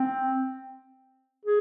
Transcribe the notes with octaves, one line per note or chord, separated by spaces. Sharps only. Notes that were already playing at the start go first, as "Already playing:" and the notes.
Already playing: C4
G#4